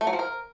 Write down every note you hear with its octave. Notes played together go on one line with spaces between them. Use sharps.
A3
F#3
F3
A#4